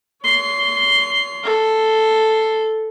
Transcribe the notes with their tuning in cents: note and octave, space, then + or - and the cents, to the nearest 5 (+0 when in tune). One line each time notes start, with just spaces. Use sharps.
C#5 +40 C6 +0
A4 +0 C6 +0